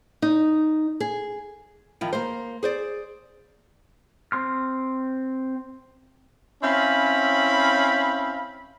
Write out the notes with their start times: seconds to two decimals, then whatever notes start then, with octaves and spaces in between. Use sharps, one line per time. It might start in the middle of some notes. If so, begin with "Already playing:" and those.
0.22 D#4
1.00 G#4
2.01 D#3 F3 E4
2.13 A#3 C5
2.63 G#4 C5 D5
4.32 C4 C6 F6
6.63 C4 C#4 E4 F5 B5